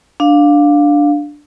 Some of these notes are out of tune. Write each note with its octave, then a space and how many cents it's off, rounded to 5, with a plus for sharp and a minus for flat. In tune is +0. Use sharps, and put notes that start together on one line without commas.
D4 +0 F5 +15